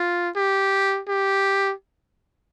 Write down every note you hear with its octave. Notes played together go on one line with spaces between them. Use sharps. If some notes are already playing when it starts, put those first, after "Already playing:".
Already playing: F4
G4
G4